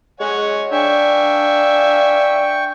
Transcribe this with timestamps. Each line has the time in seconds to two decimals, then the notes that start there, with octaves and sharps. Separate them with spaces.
0.20 G#3 C#5 F#5 G#5
0.72 D4 E5 F5 G5 G#5 C#6